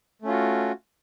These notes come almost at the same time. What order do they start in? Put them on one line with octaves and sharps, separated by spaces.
A3 C#4 F4 F#4